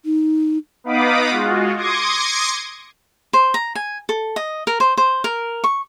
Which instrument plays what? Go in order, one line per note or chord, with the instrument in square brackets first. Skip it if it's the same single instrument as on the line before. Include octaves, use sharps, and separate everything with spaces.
[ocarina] D#4
[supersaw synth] B3 D#4 F5 B5 D6 D#6
G#3 F4 F#4
C6 D6 D#6 G#6 A#6 C#7
[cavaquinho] C5
A#5
G#5
A4
D#5
A#4
C5
C5
A#4
C#6